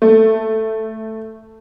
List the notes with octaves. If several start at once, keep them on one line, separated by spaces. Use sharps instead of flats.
A3